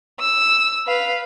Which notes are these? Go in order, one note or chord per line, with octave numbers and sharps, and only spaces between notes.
E6
B4 F5